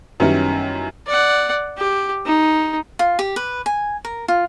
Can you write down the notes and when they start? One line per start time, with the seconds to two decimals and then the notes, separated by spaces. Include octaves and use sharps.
0.20 F#2 D#3 G3 B3 C#4 E4
1.07 D5 F#5
1.78 G4
2.26 D#4
2.99 F4
3.19 G4
3.36 B4
3.66 G#5
4.05 A#4
4.28 F4